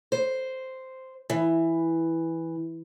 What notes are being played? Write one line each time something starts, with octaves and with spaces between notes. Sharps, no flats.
C5
E3